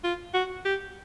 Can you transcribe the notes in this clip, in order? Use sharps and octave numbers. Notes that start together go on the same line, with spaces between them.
F4
F#4
G4